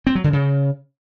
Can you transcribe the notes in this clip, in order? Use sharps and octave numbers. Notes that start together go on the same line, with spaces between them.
C4
F#3
D3
C#3